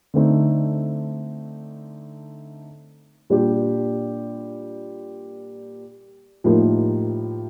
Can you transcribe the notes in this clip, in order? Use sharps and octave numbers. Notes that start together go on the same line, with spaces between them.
D3 A3 C4 D#4
A#2 G3 D4 G4
A2 F3 A#3 D#4 G4